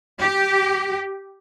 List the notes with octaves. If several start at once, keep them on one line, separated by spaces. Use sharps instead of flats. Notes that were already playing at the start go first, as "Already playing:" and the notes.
G4